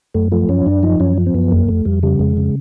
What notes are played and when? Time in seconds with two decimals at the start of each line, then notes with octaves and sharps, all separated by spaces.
0.15 F#2 A3
0.32 F3 A3
0.49 F#2 C#4
0.66 F#2 D4
0.83 F3 D#4
1.00 F#2 C#4
1.18 F3
1.26 C4
1.34 F#2 B3
1.51 F2 A#3
1.68 F2 A3
1.85 F2 G3
2.03 C#3 G3
2.19 F2 G#3
2.37 C#3